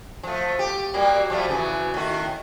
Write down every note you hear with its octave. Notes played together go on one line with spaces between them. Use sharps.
F3 A3
G4
F#3 G3 A#3
F3 G3 A3
C#3 E3 F#3
A2 D#3 F#4